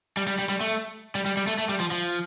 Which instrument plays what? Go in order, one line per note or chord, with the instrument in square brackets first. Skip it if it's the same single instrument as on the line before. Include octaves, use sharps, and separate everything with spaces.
[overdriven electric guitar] G3
G3
G3
G3
A3
G3
G3
G3
A3
A3
G3
F3
F3